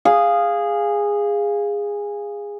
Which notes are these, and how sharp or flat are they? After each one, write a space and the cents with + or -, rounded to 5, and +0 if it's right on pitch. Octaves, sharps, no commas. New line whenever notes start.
G#4 -15 F5 +0